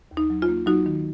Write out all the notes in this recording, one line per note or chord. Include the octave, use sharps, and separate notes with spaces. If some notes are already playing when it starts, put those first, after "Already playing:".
D#2
D#4
F#3
F4
A#3
F#3 D#4 F#4
D#3